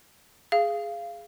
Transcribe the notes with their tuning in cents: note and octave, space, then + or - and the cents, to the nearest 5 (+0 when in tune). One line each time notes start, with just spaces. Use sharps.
G#4 +0 F5 -20